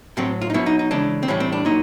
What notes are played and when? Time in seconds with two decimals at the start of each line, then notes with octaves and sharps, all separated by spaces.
0.17 A2 F#3 C4
0.41 F4
0.50 D#4
0.54 B2 F#3 E4
0.66 D#4
0.79 D#4
0.91 C#3 E3 G#3 D4
1.23 C4
1.28 A2 E3 G3 C#4
1.40 C4
1.52 D4
1.65 A#2 F#3 D#4